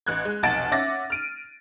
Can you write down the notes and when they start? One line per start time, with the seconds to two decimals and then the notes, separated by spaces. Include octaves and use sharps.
0.07 A1 F#6 G#6
0.25 G#3
0.43 F1 B1 F#5 A5 A6 D7
0.71 C#4 E5 F#5 D6 A6 A#6
1.10 F6 D7 D#7